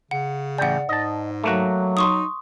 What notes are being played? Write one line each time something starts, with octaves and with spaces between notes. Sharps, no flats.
C#3 F#5
A1 D5 F#5 G5
G#2 D#5 A5
F#3 A3 A#3 F#4
D#4 C6 C#6 D#6